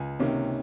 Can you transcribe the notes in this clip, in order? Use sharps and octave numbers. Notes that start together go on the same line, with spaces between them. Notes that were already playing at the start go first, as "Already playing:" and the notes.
Already playing: C#2 G#5
C3 D#3 A#3 C#4